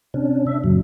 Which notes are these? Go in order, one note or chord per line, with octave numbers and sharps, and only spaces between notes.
C3 C#4 D4
D4 E5
F#2 A#2 C#3 F#3